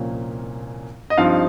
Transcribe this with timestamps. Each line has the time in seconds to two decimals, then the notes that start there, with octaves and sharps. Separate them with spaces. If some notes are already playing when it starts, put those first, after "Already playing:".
Already playing: C2 A#2 F3 A#3 C#4
1.10 D#5
1.18 G2 F3 C4 D#4 F5